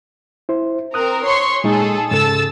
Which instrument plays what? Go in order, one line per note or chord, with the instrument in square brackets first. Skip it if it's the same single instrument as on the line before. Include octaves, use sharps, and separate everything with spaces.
[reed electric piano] E4 C5
[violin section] C4 A#4 [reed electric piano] D#6 F#6
[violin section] C#5 C6 C#6
[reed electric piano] A#2 G#3 D#4 [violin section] G#4 A4
[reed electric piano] G#2 C#3 A4 [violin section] A5 E6 A6